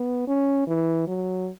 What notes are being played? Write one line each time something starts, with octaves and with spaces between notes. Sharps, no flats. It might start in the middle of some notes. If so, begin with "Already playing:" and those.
Already playing: B3
C#4
E3
F#3